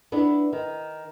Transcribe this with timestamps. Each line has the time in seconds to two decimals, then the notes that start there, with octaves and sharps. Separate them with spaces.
0.12 B3 D4 E4
0.53 D#3